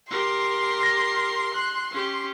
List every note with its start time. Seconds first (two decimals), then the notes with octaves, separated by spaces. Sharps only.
0.11 G4 A#4 C6
0.80 F6 A#6
1.54 F#6
1.91 C#4 G4